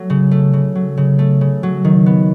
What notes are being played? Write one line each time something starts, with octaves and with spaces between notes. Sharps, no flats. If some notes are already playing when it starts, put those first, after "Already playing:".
Already playing: F#3 A3
C#3
A3
C#3
F#3
C#3
A3
C#3
F#3
D#3
B3